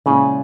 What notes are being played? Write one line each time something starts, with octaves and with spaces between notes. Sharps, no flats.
A#2 C#3 F3 G#3 C#4 E4